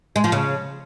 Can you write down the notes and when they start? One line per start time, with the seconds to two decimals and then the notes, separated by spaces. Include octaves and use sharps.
0.16 G#3
0.24 F3
0.32 C#3